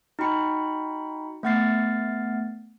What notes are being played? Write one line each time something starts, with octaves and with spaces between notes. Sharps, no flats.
D#4 F#4 G5 B5 C#7
A3 B3 F#5 F6 A6 C7